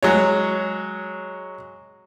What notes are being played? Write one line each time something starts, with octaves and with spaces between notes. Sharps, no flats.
F#3 G#3 C#5